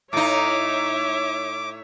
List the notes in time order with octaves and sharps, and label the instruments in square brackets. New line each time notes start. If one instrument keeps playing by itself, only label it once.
[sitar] A2 D#4 [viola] C#5 E5 [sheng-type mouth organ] D6